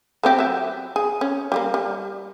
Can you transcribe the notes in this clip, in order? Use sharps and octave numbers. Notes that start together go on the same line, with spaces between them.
A3 C4 G4
F#3 E5
G#4
C#4
G3 G#3 A#3
G3